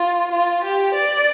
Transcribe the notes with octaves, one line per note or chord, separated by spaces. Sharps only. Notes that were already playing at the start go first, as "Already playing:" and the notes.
Already playing: F4
F4
G4
D5